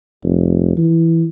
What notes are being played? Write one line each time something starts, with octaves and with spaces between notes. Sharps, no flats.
F1
E3